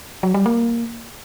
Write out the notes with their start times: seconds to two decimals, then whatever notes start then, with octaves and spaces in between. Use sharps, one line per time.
0.23 F#3
0.34 G3
0.46 A#3